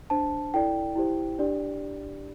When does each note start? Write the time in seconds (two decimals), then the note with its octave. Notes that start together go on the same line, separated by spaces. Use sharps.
0.10 D4 C5 A5
0.54 E4 A4 D5 G5
0.96 E4 G4 C5
1.39 D4 G4 D5